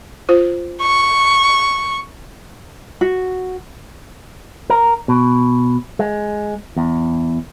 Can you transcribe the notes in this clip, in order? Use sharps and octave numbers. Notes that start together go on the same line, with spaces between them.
F4 C5
C#6
F#4
A#4
B2
G#3
E2